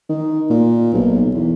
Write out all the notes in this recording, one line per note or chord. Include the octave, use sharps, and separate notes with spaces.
D#3
A#2
B1
E2